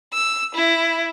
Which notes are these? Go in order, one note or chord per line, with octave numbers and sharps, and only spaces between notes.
E6
E4